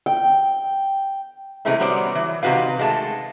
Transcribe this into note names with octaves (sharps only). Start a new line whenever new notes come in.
G5
C3 E3 G#3 A3 C4 E4
F#3 G3 B3 C5 D5
E3
C3 D#3 F#4 B4 F5
D#3 G#3 A3 E4 A5